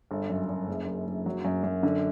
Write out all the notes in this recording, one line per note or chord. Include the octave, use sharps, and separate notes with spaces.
G1
F#2
F#2
F#1
F#1
F#1
F#3
F#2
F#2
D3